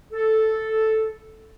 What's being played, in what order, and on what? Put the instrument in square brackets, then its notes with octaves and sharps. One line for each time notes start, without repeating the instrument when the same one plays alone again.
[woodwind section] A4